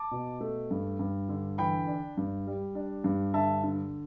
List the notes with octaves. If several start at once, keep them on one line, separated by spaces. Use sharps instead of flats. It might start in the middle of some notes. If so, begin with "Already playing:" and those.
Already playing: A5 D6
B2
A3
G2
G2
D3
E3 G5 B5
D4
G2
G3
D4
G2
D3 E5 A5
D3